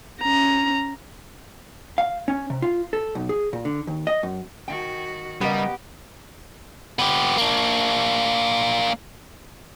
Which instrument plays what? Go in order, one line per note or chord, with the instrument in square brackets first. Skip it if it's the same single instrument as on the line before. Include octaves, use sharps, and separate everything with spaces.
[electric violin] C#4 A#5
[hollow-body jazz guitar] F5
C#4
C3
F4
A4
B1
G#4
A#2
D3
D#2
D#5
F#2
[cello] D#3 F#4 [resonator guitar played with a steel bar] G5
[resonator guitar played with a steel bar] C#3 A#4 D#5 [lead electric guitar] G3 [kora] B3 [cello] G4
[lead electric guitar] B3 G4
A#3 D4